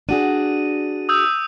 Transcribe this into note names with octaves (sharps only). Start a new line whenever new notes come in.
D4 F#4 G#4 D#7
D#6 E6 G6